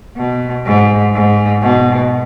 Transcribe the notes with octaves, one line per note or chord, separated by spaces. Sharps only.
B2
G#2
G#2
B2